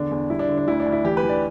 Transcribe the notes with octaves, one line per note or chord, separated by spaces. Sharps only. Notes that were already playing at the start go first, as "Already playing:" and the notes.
Already playing: E2 D3 D4
E2
G3 E4
D4
D3
D4
D2 E4
D4
D2
E4
E3 G4
B4
E3
D5